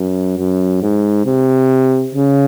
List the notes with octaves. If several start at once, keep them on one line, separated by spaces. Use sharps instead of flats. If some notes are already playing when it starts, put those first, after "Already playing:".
Already playing: F#2
F#2
G#2
C3
C#3